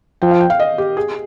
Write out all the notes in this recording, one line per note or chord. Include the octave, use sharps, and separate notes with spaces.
F3 G5
F5
G5
F5
D#5
G4
G#4